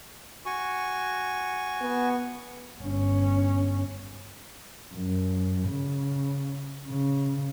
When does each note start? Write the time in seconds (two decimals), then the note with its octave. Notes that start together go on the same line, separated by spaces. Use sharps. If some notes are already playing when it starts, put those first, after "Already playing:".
0.46 F#4 G#5 C#6
1.82 B3
2.82 G1 C#4
4.95 F#2
5.68 C#3
6.87 C#3